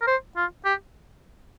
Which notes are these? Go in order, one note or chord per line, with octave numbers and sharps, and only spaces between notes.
A#4
C5
F4
G4